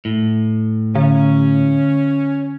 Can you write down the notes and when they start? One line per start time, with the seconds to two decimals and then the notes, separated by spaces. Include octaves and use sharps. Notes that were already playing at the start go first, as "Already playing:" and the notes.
0.05 A2
0.95 D3 C#4